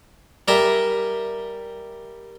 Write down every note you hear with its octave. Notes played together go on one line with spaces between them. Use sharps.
G3 A#4 E5 G#5